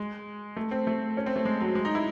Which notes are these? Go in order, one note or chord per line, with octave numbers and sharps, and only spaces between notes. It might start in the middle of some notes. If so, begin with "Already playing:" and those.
Already playing: G#3
A3
C4
A3
C#4
C4
A3
G#3
F#3
G#3
D#4
E4